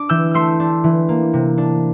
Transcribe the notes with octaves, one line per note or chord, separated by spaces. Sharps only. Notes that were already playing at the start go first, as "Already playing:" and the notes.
Already playing: D4 D6
E3 E6 G6
A3 C6 E6
D4
E3
A#3
C3
D4